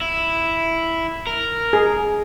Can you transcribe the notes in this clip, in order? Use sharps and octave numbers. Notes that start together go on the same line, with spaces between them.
E4
A#4
G#4